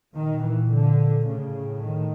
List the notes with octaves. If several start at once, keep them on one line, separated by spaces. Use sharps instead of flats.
A#2 D#3
E3
D3
A2 C#3
D#3